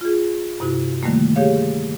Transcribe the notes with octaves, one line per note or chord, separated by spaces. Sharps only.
F4 G#4
G2 C3 E4 F#4
D3 D#3 G3 A3 A#3
G4 G#4 C#5 F5